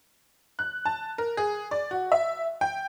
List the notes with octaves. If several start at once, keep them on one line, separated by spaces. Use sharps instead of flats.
F#6
A5
A#4
G#4
D5
F#4
E5
G5